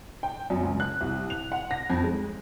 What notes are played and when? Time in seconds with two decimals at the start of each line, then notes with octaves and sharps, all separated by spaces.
0.23 G5
0.50 F#2
0.63 C#2
0.80 F#6
1.01 C2
1.30 F7
1.52 F#5
1.71 A#6
1.90 F2
2.04 G#3